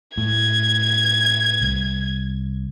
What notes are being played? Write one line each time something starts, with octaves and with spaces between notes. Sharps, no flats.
A2 G#6
C2